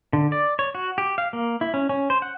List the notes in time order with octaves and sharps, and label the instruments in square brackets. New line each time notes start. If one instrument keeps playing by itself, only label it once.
[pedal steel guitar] D3
D5
C#5
F#4
G4
F5
A#3
E4
C#4
C#4
C5
F#5